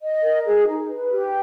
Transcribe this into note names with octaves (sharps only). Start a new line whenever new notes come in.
D#5
A#4
G#4
D#4
B4
G4